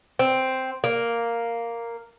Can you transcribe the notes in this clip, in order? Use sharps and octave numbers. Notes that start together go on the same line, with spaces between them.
C4
A#3